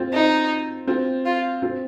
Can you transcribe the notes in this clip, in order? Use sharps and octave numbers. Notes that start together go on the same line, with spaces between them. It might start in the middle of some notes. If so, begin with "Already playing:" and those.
Already playing: C4 F4
D#4
C4 F4
F4
C4 F4